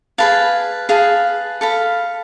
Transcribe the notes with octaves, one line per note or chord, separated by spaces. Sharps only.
G#4 B4 F5 A5
G#4 B4 F5 A5
A4 F5 B5